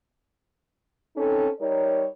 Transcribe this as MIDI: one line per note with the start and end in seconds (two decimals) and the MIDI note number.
1.16 1.47 60
1.16 1.47 61
1.16 1.47 63
1.16 1.47 69
1.60 2.06 55
1.60 2.06 63
1.60 2.06 70
1.60 2.06 73